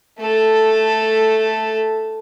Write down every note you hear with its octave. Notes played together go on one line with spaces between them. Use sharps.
A3 A4